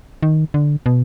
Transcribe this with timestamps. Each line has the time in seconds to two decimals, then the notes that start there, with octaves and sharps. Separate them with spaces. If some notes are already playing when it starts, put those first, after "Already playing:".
0.23 D#3
0.54 D3
0.86 B2